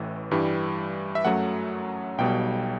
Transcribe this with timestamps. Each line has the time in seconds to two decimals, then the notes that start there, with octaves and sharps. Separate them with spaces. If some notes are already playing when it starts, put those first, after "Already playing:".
Already playing: A1 A2 E3 A3
0.31 G2 E3 G3
1.15 E5
1.25 F#2 F#3 A3 F#5
2.18 B1 B2 G3 G5